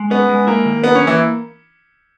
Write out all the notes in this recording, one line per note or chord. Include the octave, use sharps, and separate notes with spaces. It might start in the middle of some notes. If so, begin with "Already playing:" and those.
Already playing: G#3
B3 C#4
G#3
A#3 E4
D#3
A#3 B3
C#4
A#3
E3